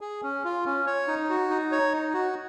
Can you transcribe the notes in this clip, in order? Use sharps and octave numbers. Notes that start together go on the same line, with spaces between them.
G#4
C#4
F4
C#4
C#5
D#4
F#4
D#4
C#5
D#4
F#4